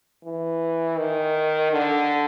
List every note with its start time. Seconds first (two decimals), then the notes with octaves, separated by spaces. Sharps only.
0.24 E3
0.99 D#3
1.72 D3